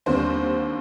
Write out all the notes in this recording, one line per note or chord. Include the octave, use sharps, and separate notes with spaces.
D#2 D3 G3 C4 C5